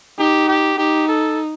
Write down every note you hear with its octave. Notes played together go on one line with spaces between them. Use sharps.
D#4 G4
G4
D#4 G4
A4